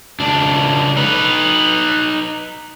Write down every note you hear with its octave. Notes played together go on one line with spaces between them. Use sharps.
C#2 D4
D#4 B4